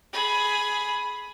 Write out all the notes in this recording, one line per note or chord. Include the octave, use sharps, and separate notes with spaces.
G#4 B5